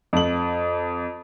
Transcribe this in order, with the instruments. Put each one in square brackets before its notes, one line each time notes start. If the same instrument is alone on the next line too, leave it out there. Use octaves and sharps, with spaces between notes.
[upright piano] F2 F#7